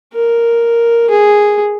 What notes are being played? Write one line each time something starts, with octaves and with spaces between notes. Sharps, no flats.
A#4
G#4